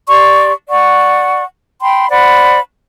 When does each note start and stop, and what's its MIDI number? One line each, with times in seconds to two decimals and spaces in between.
0.09 0.51 67
0.09 0.51 74
0.09 0.51 84
0.09 0.51 85
0.69 1.43 74
0.69 1.43 78
0.69 1.43 85
1.80 2.08 79
1.80 2.08 83
1.80 2.08 84
2.09 2.59 72
2.09 2.59 74
2.09 2.59 78
2.09 2.59 83